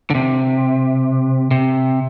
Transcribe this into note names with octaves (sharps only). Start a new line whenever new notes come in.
D3
C3
C3